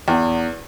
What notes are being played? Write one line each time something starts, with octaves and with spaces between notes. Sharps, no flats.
E2